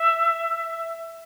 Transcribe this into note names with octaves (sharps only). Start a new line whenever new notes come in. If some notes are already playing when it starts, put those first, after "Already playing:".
Already playing: E5